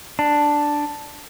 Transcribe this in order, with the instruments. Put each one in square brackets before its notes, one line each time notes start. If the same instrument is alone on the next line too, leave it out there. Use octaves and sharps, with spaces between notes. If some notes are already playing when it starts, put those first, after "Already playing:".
[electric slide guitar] D4